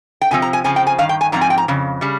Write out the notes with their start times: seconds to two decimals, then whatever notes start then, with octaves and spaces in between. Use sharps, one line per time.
0.21 G5
0.31 C3 F3 C4 G#5
0.42 A#5
0.53 G#5
0.64 C#3 F3 C4 G#5
0.76 G5
0.87 G#5
0.98 G2 D#3 F5
1.09 G5
1.21 G#5
1.32 G#2 F3 C4 A#5
1.41 G#5
1.50 G5
1.58 A#5
1.68 F2 C#3
2.01 C#3 G3